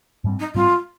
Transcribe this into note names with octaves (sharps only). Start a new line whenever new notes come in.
G#2 G3 C4
D#4
G#2 G3 C4 F4